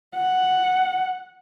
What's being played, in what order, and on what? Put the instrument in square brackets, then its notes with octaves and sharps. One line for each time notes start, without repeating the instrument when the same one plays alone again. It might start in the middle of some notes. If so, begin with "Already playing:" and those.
[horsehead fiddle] F#5